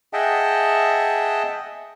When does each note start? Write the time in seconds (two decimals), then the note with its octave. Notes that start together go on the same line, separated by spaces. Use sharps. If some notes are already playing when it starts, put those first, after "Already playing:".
0.13 G#4 D#5 E5 F#5 G5 A5